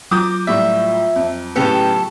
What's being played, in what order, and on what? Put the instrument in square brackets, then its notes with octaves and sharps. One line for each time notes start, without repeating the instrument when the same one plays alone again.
[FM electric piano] F#3 F4 A#5 [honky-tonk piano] D6 D#6 G6
[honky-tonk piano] A2 G3 [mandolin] E5
[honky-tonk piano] F2
[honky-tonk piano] A2 C#3 B3 [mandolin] G4 A4 C#6